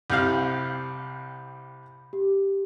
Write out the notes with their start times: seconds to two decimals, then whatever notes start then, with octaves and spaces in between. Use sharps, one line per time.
0.10 C2 C3 F5 B5 G6
2.13 G4